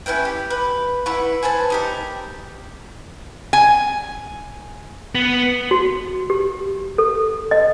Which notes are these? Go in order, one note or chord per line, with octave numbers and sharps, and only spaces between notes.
C#4 E4 B4 G5
G4
B4
E4 B4 F#5 C#6
G#4 B4 C5 A5
D#4 G4 A#4
G#5
B3
F#4
G4
A4
D#5